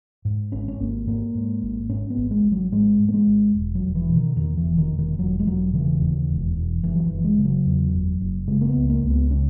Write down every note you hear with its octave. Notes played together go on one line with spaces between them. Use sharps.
G#2
G#1 C#4
C#4
G#1 A#3
G#2 A#3
G#2
G#1
G#2 C#4
B3
G#1
G#3
G#1
F#3
G#2 G#3
G#2
A#3
G#3
G#1
E1
F#3
E1
E3
B2
D#3
E2 D#3
E3
E1
D#3
E1
D#3
E1 F#3
G#3
E1 F#3
C#3 E3
D#2
E1
E1
F#1 E3
F#3
E3
F#1
G#3
C#3
F#3
E2
F#1
F#1
C#3 G#3
A#3
B3
C#2
A#3
C#2
B3
C#3 C#4